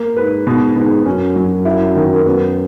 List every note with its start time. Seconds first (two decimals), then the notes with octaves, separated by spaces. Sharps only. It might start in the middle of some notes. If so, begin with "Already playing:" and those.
Already playing: A#3
0.16 G#2 B4
0.47 G#2 B2
0.76 G#2 B2
1.06 F#2 C#4
1.36 F#3
1.65 E4
1.96 D#3
2.25 F#2 B3